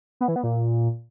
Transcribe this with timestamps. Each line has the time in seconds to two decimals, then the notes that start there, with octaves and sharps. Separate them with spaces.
0.21 B3
0.28 E3
0.36 B3
0.43 A#2